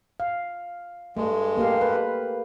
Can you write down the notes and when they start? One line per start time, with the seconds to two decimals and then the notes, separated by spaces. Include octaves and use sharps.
0.20 F5
1.17 G2 G#3 A3
1.57 A#3 G4 F5
1.81 B4